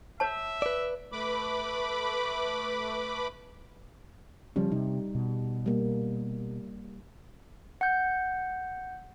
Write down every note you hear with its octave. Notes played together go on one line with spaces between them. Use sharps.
C#5 E5 A5
B4 D5
A3 B4 B5 D6
C#3 F3 G3 C#4
C3 D#4
B2
G3 A#3
F#5 G6